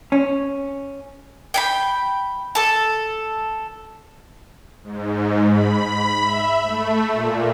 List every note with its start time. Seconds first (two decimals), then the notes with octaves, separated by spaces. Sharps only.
0.12 C#4
1.54 G5 G#5 B5
2.55 A4 A5
4.83 G#2
5.50 B5
6.22 E5
6.65 A3
7.12 A#2